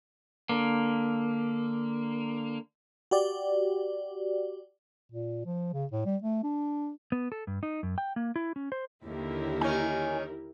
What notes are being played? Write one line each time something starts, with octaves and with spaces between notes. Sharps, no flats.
D3 A#3
F#4 G4 D5
A#2
F3
C#3
A2
G3
A3
D4
B3
A4
G2
D#4
F#2
G5
A#3
E4
C#4
C5
D#2 D3 E4 G4 A#4
D#3 C#4 G#5